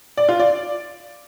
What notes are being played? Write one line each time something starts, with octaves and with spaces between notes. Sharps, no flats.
D5
F4
D5